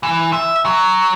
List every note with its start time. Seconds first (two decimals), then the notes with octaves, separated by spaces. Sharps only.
0.03 E3
0.33 E5
0.65 F#3